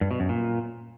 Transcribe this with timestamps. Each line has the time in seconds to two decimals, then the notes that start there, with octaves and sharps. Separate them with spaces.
0.01 G2
0.11 B2
0.20 F#2
0.29 A#2